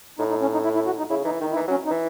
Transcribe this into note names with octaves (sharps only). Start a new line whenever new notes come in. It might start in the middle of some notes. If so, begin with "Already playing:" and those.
A2 D#4
D#4
C#4
D#4
E4
E4
F#4
D#4
C#3 E4
E3 D#4
D#3 D#4
E4
E3 D#4
F#3 C#4
D#4
E3